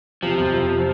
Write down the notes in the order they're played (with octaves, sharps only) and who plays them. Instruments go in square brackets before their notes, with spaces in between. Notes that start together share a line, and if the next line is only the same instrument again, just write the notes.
[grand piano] C3 [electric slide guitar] F3
[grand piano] F2
C3